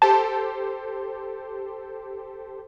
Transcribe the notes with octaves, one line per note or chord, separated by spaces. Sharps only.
G4 A4 C5 A5